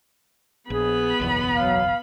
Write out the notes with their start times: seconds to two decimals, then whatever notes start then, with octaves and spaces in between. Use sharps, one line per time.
0.70 A#1 B3 G#4 B5
1.20 F#1 B1 E2
1.55 F#3 F5